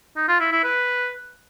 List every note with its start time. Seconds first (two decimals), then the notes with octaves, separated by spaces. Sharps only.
0.17 D#4
0.28 F4
0.40 E4
0.52 E4
0.64 B4